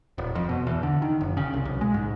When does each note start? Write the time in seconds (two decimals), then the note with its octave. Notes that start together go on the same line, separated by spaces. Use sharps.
0.18 D#1
0.35 F2
0.49 B2
0.67 E2
0.83 D3
1.02 D#3
1.21 F#1
1.37 C#3
1.53 C2
1.65 B1
1.81 G#3
1.94 G#2